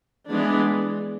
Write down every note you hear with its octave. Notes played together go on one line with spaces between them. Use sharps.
E3 G#3 B3 D4